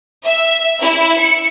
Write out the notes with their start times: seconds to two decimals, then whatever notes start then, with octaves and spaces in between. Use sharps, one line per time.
0.24 E5
0.81 E4
1.18 C#7